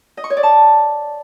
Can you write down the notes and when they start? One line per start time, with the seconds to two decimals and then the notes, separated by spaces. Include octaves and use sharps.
0.17 D#5
0.24 C#6
0.30 C#5
0.37 D5
0.43 A5